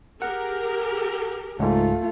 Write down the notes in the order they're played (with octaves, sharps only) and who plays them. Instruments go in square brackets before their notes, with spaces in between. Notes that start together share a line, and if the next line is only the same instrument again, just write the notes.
[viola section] G4 G#4 A#4 [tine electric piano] F#5
[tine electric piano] C#2 G#2 [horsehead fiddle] A3 F4